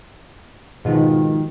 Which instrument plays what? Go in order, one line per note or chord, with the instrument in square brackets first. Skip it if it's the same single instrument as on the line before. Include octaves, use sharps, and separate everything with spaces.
[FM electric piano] G#2 B2 F3 [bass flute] D#3